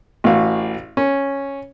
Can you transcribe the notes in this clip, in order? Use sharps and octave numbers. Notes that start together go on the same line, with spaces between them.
A1 A2 F#4 F5
C#4